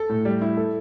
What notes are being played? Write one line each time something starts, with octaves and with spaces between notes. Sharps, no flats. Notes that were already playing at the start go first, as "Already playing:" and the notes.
Already playing: A4
A2
G3
E4
A4